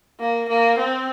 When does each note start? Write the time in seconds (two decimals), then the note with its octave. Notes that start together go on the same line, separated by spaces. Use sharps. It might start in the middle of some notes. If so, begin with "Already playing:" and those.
0.20 A#3
0.49 A#3
0.78 C4